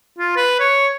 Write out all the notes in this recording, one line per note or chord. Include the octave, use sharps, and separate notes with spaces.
F4
B4
C#5